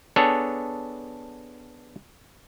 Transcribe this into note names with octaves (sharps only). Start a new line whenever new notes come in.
B3 D4 G#4 A4 C#5